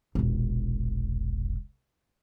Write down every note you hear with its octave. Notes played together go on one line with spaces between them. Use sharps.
E1 A#1